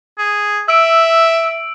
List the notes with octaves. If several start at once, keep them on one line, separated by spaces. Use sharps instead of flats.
G#4
E5 E6 D7